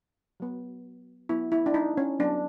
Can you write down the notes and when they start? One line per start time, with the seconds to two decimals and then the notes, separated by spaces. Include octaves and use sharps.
0.40 F#3 B3
1.29 F#3 B3 E4
1.52 E4
1.66 D4
1.74 D#4
1.97 C#4
2.19 F#3 B3 D4